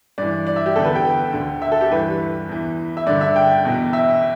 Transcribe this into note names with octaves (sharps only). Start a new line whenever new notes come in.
G2 E3 D5
D5
E5
G4
E2 D3 A4
B4
G5
D2 D3
E5
A4
G4
G2 E3 B4
E2 E3
E5
G2 D3 D5
E5
G5
E2 B2
E5